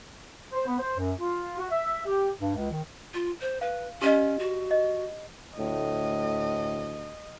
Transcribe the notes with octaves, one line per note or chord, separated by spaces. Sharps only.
C5
B3
C5
F#2
F4
F#4
E5
G4
G2
C#2
D#3
F4
C5
B4 F5
C#4 G4 D5 D#5
F#4
D#5
D2 A2 D#5